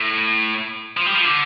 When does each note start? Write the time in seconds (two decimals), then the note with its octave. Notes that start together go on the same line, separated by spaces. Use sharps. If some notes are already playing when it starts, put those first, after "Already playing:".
Already playing: A2
0.97 F3
1.06 G3
1.15 F3
1.25 D3